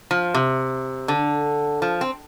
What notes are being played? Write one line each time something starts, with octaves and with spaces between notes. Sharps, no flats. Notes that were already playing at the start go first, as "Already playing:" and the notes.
F3
C3
D3
F3
C4